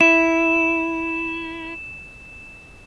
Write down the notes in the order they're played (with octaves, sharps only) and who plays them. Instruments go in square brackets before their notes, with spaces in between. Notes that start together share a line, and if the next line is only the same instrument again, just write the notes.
[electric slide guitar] E4 [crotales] E7